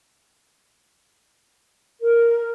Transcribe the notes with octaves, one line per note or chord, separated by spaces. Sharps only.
A#4